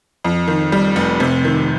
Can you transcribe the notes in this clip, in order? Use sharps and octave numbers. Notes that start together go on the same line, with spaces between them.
F2
D#3
G3
F1
C3
D#3